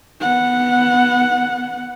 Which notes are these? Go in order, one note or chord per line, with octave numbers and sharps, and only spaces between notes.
B3 F#5